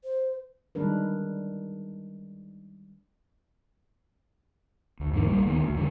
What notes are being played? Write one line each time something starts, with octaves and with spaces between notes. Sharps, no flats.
C5
D#3 G3 G#3 D4 A#4 B4
D2
E2 G#2 D3 D#3
A#1 G3 A#3
D#1 D2 D#3 B3
D2
F2 D3 G#3 C#4